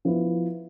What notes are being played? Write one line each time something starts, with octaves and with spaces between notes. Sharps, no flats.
F3 B3 E4